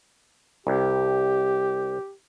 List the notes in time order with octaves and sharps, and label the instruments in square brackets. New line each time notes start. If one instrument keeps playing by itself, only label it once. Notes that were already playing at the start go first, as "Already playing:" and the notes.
[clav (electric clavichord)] C2 [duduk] G4